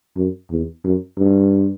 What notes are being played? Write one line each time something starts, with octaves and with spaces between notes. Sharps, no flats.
F#2
E2
F#2
G2